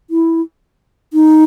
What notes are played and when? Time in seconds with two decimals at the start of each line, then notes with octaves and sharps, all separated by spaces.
0.10 E4
1.13 D#4